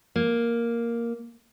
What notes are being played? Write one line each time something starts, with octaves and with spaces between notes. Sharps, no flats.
A#3